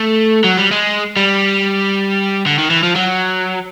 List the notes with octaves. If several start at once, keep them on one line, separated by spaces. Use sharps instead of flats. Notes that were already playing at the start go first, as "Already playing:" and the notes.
Already playing: A3
F#3
G3
G#3
G3
D3
D#3
E3
F3
F#3